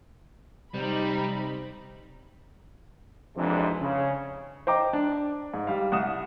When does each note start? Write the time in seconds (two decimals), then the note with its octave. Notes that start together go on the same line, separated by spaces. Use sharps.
0.74 C3 G3 C4 D#4 B5
3.37 F2 G#2 C3 E3 G#3 D4
3.81 C#3
4.67 C5 D#5 G5 A#5 D6
4.93 D4
5.54 G#2
5.67 G3 F5
5.92 C2 F#5 D#6 E7